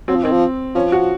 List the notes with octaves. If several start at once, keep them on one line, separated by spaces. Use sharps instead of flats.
F#3 C4
F3
D#3 C4
F3
F3 C#4
F#4